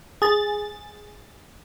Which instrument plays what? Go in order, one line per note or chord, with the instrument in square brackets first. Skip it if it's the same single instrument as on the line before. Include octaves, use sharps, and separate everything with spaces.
[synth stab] G#4 A6